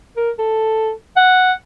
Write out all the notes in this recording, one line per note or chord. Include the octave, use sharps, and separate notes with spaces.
A#4
A4
F#5